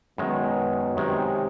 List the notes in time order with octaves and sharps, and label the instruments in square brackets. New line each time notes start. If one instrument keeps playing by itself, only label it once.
[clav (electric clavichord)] F#2 D#3 G#3 [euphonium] B2
[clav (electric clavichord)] F#2 D#3 G#3 [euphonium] C3